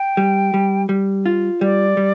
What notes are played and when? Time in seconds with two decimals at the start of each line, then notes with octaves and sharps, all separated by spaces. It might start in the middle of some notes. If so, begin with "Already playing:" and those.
Already playing: G5
0.17 G3
0.54 G3
0.89 G3
1.26 F4
1.61 G3 D5
1.97 G3